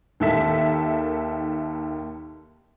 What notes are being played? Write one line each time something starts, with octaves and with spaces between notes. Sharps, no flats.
D#2 D#3 A4 E5 B6